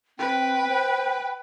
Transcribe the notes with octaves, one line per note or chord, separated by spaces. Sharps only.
C4 B4 G5
C5